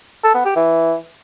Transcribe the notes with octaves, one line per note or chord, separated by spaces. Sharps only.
A4
B3
G4
E3